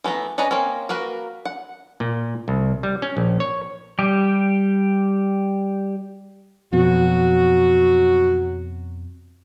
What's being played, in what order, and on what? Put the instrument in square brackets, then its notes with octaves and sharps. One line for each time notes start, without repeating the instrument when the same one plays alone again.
[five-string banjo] E3 A3 B3 A#5
C#4 D4 B4 D#5 A#5
A#3 C4 C#4
A#3 F#4 A#4 B4
F#5
[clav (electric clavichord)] A#2
C2
G3
C#4
A#1
C#5
[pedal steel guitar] G3 G4
[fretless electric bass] F2 B2 [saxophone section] F#3 F#4